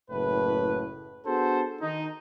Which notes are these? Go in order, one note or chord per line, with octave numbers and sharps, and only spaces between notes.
F#1 A2 B4
B3 D4 F#4 G#4 A4 C5
D#3 D#4